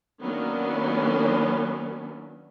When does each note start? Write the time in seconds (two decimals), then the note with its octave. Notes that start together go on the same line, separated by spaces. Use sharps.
0.23 D#3 F#3 A#3 B3 C#4 D4